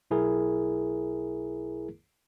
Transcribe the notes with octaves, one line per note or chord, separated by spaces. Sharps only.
B1 E4 G#4 A#4